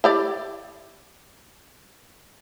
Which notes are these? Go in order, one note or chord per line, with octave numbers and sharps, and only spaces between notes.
E4 G4 D5